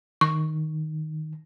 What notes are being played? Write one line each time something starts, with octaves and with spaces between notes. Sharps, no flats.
D#3 C#6